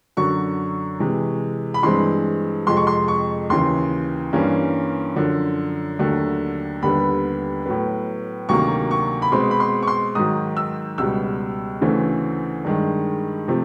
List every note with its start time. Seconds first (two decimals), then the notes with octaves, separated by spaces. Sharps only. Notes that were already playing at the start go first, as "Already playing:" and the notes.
0.17 F#2 D3 F#3 C#6
1.00 C3 E3 G#3
1.74 B5
1.83 G2 E3 G#3 C4 C6
2.67 F2 C3 F3 G#3 C6
2.77 C#6
2.87 C6
3.08 C#6
3.50 D#2 C#3 E3 C6
4.33 G2 E3 G3 A#3 C#4
5.16 F#2 D3 F3
5.99 D#2 D3 F#3 A3
6.82 D#2 D3 G3 B3 B5
7.66 A2 F#3 B3
8.49 D2 C3 D#3 F#3 A#3 C#6
8.91 C#6
9.22 B5
9.32 B2 G#3 C4 C6
9.51 B5
9.60 C6
9.83 C#6
9.87 C6
10.15 G#2 D#3 F#3 D#6
10.57 E6
10.98 C#2 B2 G3 E6
11.81 D2 C#3 E3 A3 C4
12.65 G2 D#3 G#3
13.48 C3 F3 A3 C4